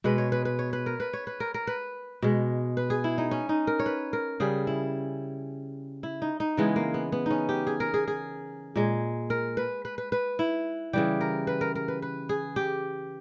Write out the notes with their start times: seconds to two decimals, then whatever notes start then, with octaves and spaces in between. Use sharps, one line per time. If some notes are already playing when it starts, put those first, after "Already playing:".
0.04 B2 G#3 B4
0.18 C#5
0.32 B4
0.45 B4
0.59 C#5
0.73 B4
0.86 A#4
1.00 B4
1.13 C#5
1.27 B4
1.40 A#4
1.54 A#4
1.67 B4
2.22 B2 G#3
2.77 B4
2.90 G#4
3.04 E4
3.18 D#4
3.31 C#4
3.49 D#4
3.67 A#4
3.80 C#5
3.86 B4
4.13 A#4
4.40 C#3 G3 G#4
4.67 E4
6.03 E4
6.22 D#4
6.40 D#4
6.57 C#3 E3 G#3 B3
6.76 A#3
6.94 B3
7.12 B3
7.26 C#4 D#4
7.49 G4
7.67 G#4
7.80 A#4
7.94 G#4
8.07 G#4
8.76 A#2 G#3
9.30 A#4
9.57 B4
9.85 B4
9.98 B4
10.12 B4
10.39 E4
10.93 C#3 E3 G3 G4
11.21 A#4
11.47 B4
11.61 A#4
11.75 A#4
11.88 B4
12.02 B4
12.29 G#4
12.56 G4